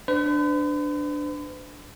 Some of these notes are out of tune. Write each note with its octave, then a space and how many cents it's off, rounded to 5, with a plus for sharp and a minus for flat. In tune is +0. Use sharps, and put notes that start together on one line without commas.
D4 +5 B4 +45